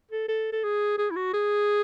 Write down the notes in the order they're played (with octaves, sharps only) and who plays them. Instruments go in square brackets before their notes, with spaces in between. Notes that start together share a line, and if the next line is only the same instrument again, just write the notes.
[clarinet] A4
A4
A4
G#4
G#4
E4
F#4
G#4